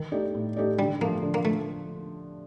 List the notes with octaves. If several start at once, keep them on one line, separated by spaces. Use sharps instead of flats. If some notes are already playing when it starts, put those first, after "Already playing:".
Already playing: D#3
A3 D#4 G4 D5
A2
A3 D#4 G4 D5
D3 G3
F3 A3 A#3
D3
A#3
F3 A3